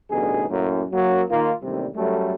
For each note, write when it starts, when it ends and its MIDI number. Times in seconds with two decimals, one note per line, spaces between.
0.11 0.45 33
0.11 0.45 43
0.11 0.45 47
0.11 0.45 50
0.11 0.45 63
0.11 0.45 68
0.49 0.84 42
0.49 0.84 45
0.49 0.84 58
0.91 1.23 42
0.91 1.23 54
0.91 1.23 58
1.31 1.52 51
1.31 1.52 58
1.31 1.52 65
1.62 1.86 33
1.62 1.86 39
1.62 1.86 48
1.62 1.86 55
1.95 2.34 42
1.95 2.34 54
1.95 2.34 55
1.95 2.34 57